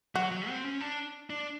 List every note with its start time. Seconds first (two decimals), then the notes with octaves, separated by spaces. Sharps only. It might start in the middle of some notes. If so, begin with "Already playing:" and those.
0.15 F#3 F#4
0.31 F#3
0.49 C4
0.64 C#4
0.81 D4
1.30 D4